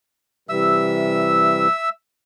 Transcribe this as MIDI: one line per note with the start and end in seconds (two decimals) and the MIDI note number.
0.49 1.67 48
0.49 1.67 52
0.49 1.67 55
0.49 1.89 76
0.49 1.89 88